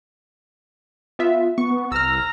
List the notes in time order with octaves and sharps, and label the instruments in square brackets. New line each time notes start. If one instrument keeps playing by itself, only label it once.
[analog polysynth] B3 F4 E5
[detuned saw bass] B3 [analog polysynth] C#6
[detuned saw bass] C2 [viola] A#5 [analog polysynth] E6 F6